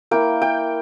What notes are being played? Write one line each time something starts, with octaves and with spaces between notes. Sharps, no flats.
A#3 E4 G5
G5